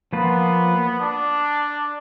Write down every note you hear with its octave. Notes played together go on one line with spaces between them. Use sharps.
F3 A#3 B3 F4 B4
D4